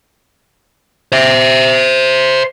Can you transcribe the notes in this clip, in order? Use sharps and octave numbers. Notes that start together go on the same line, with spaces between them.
C5 E5